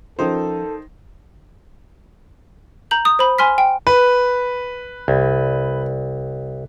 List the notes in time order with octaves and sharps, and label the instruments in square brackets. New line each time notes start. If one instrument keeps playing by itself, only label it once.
[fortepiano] D#3 D#4 C5 [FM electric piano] F3 C#4 F4 [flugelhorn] A4
[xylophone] A#5 G6 F#7
D#6
C5 B5
G#5 C6 F6 B6
G5
[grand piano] B4
[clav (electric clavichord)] C2